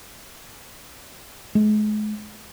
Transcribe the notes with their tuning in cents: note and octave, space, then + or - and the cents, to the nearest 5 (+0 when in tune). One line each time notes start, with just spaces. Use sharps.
G#3 +40